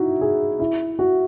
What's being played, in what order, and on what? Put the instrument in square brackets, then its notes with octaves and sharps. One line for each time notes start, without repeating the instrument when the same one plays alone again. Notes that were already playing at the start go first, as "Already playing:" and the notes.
Already playing: [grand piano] D#4 E4 F#4
G#4
E4
F#4